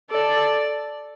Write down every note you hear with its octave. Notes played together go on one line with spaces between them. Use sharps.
A4 D5